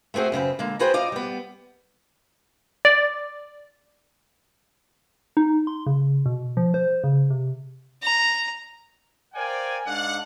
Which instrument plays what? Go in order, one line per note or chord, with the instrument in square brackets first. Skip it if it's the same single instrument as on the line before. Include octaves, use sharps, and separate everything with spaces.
[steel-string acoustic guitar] A3 B3 C4 F#4 G#4
F#2 C#3 C4 B4
D3 G#3 A#3
F#4 G#4 B4 C5 G5
D#4 F4 D5 D#5
G3 B3
[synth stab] D5
[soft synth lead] D#4
C6
C#3
B2
F3
C5
C#3
C3
[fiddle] A#5
[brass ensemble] A#4 C5 D5 F5 G5 G#5
G#2 D4 D5 F5 F#5